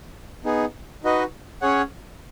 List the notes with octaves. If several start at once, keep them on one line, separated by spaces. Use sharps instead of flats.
B3 D#4 G#4
D#4 F#4 B4 D#5
C#4 G#4 C#5 F#5